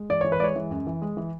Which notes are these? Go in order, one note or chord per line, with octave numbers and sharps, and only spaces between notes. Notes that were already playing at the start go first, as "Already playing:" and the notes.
Already playing: G#3
E3 D5
E3 C#5
B4
G#3 C#5 D5
E3
F#2
E3
G#3
E3